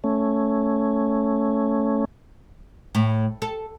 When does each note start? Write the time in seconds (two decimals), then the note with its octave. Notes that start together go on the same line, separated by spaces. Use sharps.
0.04 A3 C#4
2.95 A2
3.42 A4